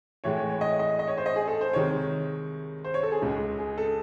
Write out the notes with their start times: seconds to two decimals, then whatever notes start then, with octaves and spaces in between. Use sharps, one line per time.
0.24 A2 E3 G#3 C#5
0.37 C#5
0.49 C#5
0.61 D#5
0.79 D#5
0.99 D#5
1.08 C#5
1.18 C5
1.26 D#5
1.36 G#4
1.47 A4
1.61 C5
1.73 C2 C3 D#3 G#3 C#5
2.84 C5
2.94 C#5
3.03 A4
3.12 G#4
3.22 C#2 C#3 G#3
3.58 G#4
3.78 A4